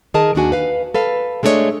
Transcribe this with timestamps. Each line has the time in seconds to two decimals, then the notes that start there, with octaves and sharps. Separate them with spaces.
0.14 D#3 G#4 A#4 D#5 A5
0.35 D#2 D4 F#4 G#5
0.52 B4 F5
0.94 A4 B4 F5
1.43 G#3 A3 D4 F#4 C#5 D#5